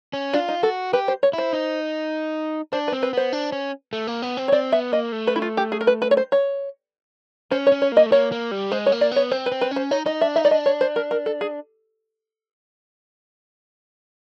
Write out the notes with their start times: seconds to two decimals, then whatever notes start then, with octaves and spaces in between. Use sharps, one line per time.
0.13 C#4
0.33 D4 F4
0.48 D#4
0.63 F#4 A4
0.93 G4 B4
1.08 C5
1.23 C#5
1.33 E4 C5
1.53 D#4
2.73 D4 C5
2.88 B4
2.92 C4
3.03 B4
3.13 B3 C5
3.33 D4
3.52 C#4
3.93 A3
4.07 A#3
4.22 B3
4.37 C4
4.48 C#5
4.52 C4 D5
4.72 B3 E5
4.92 A#3 D#5
5.12 A3
5.27 B4
5.36 E4
5.42 F4
5.57 G4
5.72 G#4
5.81 A#4
5.87 B4
6.02 B4
6.11 C#5
6.17 C5
6.32 C#5
7.51 C#4 C5
7.67 C#5
7.72 C#4
7.82 C#5
7.92 A#3 D#5
8.06 A3
8.12 A#3 C#5
8.32 A#3
8.51 G3
8.71 G#3 C5
8.86 C#5
8.92 A#3
9.01 D5
9.11 B3 C#5
9.31 C4 C5
9.46 B4
9.52 C4
9.61 B4
9.71 C#4
9.76 C5
9.91 D#4 C#5
10.06 D#4 D#5
10.21 D4 E5
10.36 D#4 E5
10.45 D5
10.51 D4 D#5
10.66 C#5
10.81 C5
10.96 A#4
11.11 A#4
11.26 A4
11.41 G#4